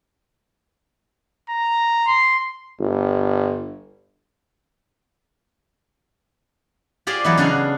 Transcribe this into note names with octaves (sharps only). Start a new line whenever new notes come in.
A#5
C6
G1
F4 G4 G#4 C5 D5
E3 F#3 B3 D#4 A4
C#3 D4 F#4 F5 G#5